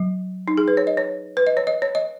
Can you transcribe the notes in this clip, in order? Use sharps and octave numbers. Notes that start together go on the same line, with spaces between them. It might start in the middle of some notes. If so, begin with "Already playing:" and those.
Already playing: F#3
D#4
G#4
B4
C#5
D#5
C#5
B4
D#5
C#5
D#5
C#5
D#5